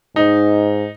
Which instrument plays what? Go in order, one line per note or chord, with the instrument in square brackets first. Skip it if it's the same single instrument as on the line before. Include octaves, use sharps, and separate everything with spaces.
[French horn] G#2 [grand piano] D#4